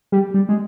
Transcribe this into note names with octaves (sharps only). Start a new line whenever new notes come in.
G3
G3
G#3